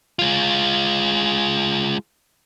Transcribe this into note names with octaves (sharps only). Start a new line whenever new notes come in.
G#3 F4